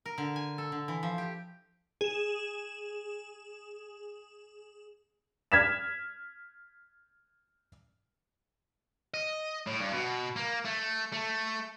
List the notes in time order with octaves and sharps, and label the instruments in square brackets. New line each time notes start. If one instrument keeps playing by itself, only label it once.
[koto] A#4
D3
G#5
A4
D3
E3
F3
G4
[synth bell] G#4 E7
[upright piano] F6 G#6 B6 E7
[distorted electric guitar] D#5
A2
G2
B2
A#3
A3
A3